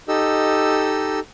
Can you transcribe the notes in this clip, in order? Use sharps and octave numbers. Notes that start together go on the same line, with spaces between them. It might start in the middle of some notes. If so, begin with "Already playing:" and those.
D#4 G4 A4 D#5 E6